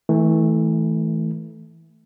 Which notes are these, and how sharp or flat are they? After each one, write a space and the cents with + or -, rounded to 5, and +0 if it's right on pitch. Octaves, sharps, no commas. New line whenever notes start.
E3 -25 A3 +0